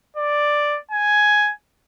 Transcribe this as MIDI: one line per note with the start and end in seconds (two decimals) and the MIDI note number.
0.17 0.79 74
0.91 1.52 80